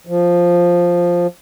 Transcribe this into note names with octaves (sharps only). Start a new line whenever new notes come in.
F3